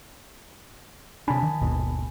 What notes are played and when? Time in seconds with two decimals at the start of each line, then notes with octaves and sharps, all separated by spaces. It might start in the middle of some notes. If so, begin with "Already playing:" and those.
1.28 C3 D4 G#5 A5 B5
1.43 D#3
1.61 G#1 D#2 B2